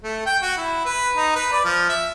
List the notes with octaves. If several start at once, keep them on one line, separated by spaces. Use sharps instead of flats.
A3
G5
F#4
E4
B4
D#4
B4
D5
F3
E5